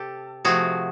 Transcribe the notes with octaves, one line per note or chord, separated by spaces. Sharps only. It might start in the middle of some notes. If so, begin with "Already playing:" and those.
Already playing: C3 G4 A4
C3 F3 A3 F#4 G#4